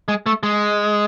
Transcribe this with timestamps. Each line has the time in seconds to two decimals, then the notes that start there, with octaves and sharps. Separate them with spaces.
0.08 G#3
0.26 A3
0.43 G#3